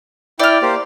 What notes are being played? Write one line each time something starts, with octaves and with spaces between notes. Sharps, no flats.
E4 D5 G5 F6
A#3 G4 C5